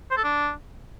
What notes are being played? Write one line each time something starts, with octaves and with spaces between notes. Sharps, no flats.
C5
A4
D4